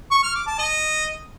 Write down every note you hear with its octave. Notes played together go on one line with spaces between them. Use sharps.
C#6
F6
D6
A5
D#5